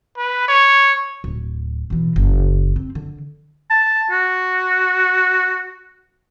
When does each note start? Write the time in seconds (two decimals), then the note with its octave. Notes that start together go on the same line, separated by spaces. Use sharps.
0.17 B4
0.48 C#5
1.24 D1
1.90 B2 E3
2.16 F#1
2.76 C4
2.95 D3
3.70 A5
4.11 F#4